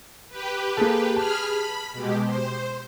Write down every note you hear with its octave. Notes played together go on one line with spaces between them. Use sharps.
G4 B4
A#3 G#4 A4
G#4 A5 B5 F6
B5
B2 G#3 G4
C5